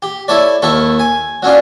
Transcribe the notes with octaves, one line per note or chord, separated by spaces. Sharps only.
G4
E4 A4 C#5 D5
D#2 D#3 E4 A4 C#6
G#5
F#3 C#4 D4 F4